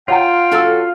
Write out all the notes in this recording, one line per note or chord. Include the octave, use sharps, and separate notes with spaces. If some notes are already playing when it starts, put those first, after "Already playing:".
F4 C#5 F#5 G5 A#5
F#3 C#4 A4 F5 E6